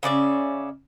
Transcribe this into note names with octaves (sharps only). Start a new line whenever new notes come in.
C#3 C#4 D5 E5